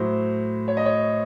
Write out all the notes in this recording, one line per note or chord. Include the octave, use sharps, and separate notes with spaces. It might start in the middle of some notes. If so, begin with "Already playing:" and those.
Already playing: A2 F#3 C5
C#5
D#5
C#5